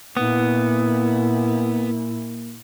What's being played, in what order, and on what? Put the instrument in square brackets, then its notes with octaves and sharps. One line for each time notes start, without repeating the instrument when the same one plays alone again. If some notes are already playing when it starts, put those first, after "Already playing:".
[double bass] A#2 E4 [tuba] A#3 [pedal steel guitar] B3